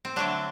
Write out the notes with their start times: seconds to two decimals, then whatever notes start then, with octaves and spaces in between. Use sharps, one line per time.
0.05 C4
0.16 D3 F#3 A3 D4